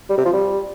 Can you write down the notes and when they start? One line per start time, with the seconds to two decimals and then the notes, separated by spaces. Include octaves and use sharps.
0.10 G3
0.18 C3
0.26 F3
0.34 G3